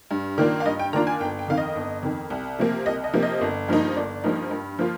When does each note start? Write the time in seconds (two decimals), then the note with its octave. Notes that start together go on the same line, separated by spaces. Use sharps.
0.11 G2
0.38 D#3 A#3 D4 F4
0.60 F5
0.66 G2 D#5
0.79 G5
0.93 D#3 A#3 D4 F4 A#5
1.07 G#5
1.21 G1 G5
1.39 G5
1.48 F2 D#3 F5
1.58 D#5
1.76 G1
2.03 F2 D#3
2.30 C2
2.59 C3 F3 A#3
2.86 C2 D#5
3.04 D#5
3.13 C3 F3 A#3
3.23 D#5
3.41 G1
3.68 G2 F3 A#3 D#4
3.96 G1 D5
4.24 G2 F3 A#3 D#4
4.51 G2
4.79 F3 A#3 F4